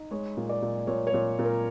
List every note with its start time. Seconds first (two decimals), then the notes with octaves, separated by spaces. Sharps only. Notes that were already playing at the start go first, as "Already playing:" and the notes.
Already playing: D#4
0.11 G#3 C#5
0.37 A#2
0.49 D5
0.62 A#2
0.87 A#2 C#5
1.07 C#5
1.14 A#2
1.39 A#2
1.45 A#4